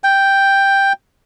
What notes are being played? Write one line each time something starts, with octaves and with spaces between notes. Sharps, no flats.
G5